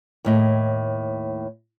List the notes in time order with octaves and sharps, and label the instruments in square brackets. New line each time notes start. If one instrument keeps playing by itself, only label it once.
[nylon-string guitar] D#2 A2 D#5